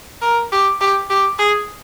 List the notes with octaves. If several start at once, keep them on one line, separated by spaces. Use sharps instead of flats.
A#4
G4
G4
G4
G#4